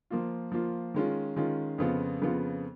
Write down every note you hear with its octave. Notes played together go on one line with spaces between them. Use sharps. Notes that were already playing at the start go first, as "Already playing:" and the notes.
F3 A#3 F4
F3 A#3 F4
D#3 G#3 C#4 F4
D#3 G#3 C#4 F4
F2 C#3 F3 B3 F4
F2 C#3 F3 B3 F4